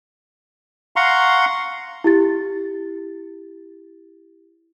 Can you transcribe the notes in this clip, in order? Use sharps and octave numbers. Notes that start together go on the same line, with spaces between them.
F5 F#5 A#5 C6 C#6
E4 G4 A6